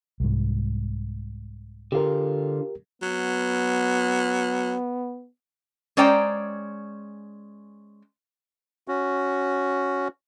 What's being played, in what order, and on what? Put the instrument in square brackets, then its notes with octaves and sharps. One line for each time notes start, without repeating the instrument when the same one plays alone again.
[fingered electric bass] C2 G#2
[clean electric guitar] D3 F4 [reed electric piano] G4 A#4
[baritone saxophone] F#3 [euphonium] B3
[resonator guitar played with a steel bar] G#3 C#4 C5 D5 G5 A#5
[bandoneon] C#4 F#4